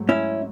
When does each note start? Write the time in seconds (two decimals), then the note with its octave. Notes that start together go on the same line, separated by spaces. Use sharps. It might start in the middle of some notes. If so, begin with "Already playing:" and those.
Already playing: G#2 F#3 A3
0.09 C#4 E4